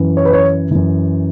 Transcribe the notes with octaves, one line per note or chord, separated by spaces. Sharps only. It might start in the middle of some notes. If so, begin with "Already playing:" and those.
Already playing: F#2 E3
C#5
B4
C#5
F#2 E3